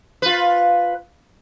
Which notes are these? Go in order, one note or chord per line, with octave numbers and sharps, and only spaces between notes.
F4 B4